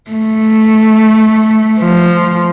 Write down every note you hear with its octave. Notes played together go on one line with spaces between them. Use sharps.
A3
F3